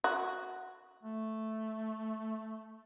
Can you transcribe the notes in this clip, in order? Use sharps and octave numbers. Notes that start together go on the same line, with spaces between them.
F#4
A3